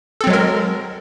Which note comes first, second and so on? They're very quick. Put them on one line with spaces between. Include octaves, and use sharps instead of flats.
A4 C4 F#3 G#3 A#4